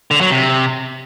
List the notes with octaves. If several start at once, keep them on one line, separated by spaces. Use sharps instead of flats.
D3
F#3
C3